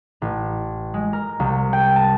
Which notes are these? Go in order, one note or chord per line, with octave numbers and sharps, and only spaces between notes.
A1
G#3
A#4
C2
G5
A5